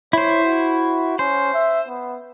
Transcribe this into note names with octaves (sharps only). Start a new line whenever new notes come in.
E4 C5 C#5
F#4
C#4 C5
E5
B3